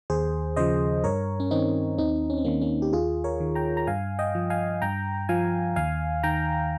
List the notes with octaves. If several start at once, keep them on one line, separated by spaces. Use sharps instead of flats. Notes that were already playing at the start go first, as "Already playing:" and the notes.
D#2 G#4 C5
C#3 F3 C5 D#5
G2 A#4 C#5
C#4
D#3 C4 D#4
D#2 C4 D#4
C#4
C4
D#3 A#3 C#4
A#3 C#4
G4
D#2 F4 G#4
A#4 C#5
D#3
G5 A#5
A#5
G2 F5 G#5
D#5 G5
F3
F5 G#5
G2 G5 A#5
F3 F5 G#5
D#2 F5 G#5
D#3 G5 A#5